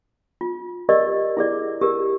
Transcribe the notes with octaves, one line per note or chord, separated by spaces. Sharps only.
F4
G4 A#4 D5 D#5
E4 G#4 D5
G4 A#4